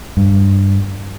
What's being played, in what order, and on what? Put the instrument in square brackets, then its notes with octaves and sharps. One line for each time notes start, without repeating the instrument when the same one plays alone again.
[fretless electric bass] G2